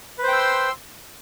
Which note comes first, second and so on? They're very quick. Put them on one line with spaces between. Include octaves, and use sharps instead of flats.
B4 C5 G5 E6 C6